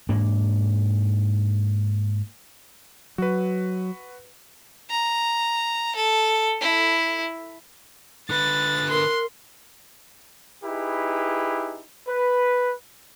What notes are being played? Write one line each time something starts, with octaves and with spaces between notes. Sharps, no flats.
G#2 A#3 D4
F#3 F#4 B4
A#5
A4
E4
D3 B4 F#6 A6
A#4 C6
D#4 E4 G4 G#4 B4
B4